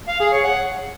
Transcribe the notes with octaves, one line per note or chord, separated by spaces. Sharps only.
F5
G#4
C#5
F#5